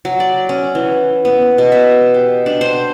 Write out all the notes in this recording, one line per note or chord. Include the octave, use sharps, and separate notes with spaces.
F#3
D5
C#4
E3
B3
B2
E5
G4
D4
C5